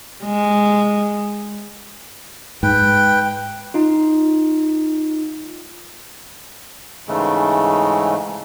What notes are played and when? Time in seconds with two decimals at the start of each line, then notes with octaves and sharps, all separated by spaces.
0.24 G#3
2.63 G#2 B4 G5
3.74 D#4 F4
7.08 G#2 C#3 E3 G#3 A3